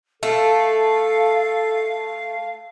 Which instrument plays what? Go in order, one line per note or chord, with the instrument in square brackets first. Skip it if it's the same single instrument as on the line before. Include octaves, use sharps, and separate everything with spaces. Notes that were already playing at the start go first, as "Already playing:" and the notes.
[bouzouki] A3 [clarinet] A4 [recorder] F5